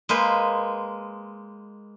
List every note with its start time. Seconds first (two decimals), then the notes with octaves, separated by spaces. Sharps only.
0.09 G#3 A#3 B4 C5